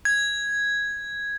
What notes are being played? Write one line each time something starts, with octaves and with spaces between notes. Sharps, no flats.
G#6